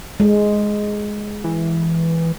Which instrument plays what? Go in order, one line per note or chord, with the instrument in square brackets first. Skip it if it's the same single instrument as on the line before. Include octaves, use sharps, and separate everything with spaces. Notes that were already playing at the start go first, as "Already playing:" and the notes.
[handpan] G#3
[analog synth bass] E3